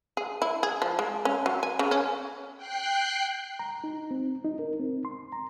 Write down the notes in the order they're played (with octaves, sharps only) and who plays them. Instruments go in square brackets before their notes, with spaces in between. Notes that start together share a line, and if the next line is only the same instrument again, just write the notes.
[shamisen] G#4
E4
G#4
F3
G#3
C#4
F#3
G#5
C#3
C#4
[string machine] G5 F#6 C7
[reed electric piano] A#5
D#4
C4
D#4
A#4
C4
C6
A#5